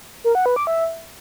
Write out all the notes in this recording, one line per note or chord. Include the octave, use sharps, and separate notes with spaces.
A#4
F#5
B4
D6
E5